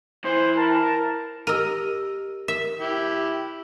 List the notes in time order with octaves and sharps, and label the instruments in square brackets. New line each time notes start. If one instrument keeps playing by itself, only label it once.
[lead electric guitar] E3 [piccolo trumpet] C5
[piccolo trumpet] A#4 [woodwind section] A5
[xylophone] G4 E6 D#7 [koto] A#4 D#5
[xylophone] A#4 [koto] E5
[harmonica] E4 G4